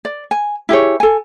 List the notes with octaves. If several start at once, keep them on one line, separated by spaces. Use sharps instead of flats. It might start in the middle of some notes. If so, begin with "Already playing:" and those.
D5
G#5
E4 G4 G#4 C#5
A4 G#5